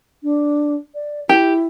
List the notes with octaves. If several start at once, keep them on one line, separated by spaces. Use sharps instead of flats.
D4
D5
E4 G4